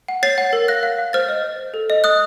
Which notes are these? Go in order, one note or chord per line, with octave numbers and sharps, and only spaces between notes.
F#5
C#5 A6 C7
F#5
A#4
F5 F#6 A#6
F5
F5
C5 F6 A6
D#5
C5
C5
A4
D#5
D#5 D#6 F#6